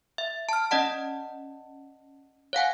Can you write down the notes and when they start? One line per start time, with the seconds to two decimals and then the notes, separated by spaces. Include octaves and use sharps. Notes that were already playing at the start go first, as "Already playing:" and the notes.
0.18 E5
0.49 A5 F6
0.71 C#4 D5 D#5 F#5 A5
2.53 C#5 F5 F#5 G#5